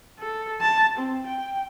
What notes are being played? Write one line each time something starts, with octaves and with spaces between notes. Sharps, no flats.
A4
A5
C4
G5